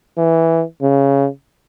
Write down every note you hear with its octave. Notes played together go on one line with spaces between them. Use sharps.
E3
C#3